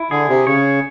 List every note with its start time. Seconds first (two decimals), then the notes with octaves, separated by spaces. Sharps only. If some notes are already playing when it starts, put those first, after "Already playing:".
Already playing: E4
0.11 D3 G#4
0.29 C3
0.47 C#3 C#5